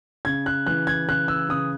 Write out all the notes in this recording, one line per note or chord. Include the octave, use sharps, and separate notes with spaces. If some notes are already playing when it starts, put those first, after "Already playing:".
C#3 G#6
F#6
E3 F#6
G#6
C#3 F#6
E6
C#3 D#6